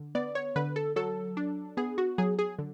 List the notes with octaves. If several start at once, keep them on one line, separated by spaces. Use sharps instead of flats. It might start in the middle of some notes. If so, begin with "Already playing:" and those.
Already playing: D3
B3 D5
C#5
D3 B4
A4
F#3 A4
D4
B3 G#4
F#4
F#3 G#4
G#4
D3